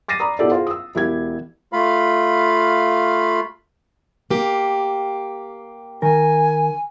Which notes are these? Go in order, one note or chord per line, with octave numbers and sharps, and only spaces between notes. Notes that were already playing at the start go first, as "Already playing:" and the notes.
D6 A6 A#6 C7 D#7
D5 A#5 B5 D6 D#6
B2 E4 G4 A4 D5
F4 G#4 C5
D#6 E6
E1 E4 G4 G#6
A3 F4 F5 B5
A#3 G4
D#3 A#4 G#5